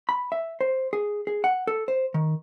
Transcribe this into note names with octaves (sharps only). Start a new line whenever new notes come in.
B5
E5
C5
G#4
G#4
F#5
A4
C5
D#3